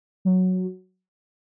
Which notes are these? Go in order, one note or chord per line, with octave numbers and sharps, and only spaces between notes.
F#3